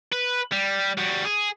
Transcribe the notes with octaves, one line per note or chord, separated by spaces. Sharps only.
B4
G3
G3 F#4
G#4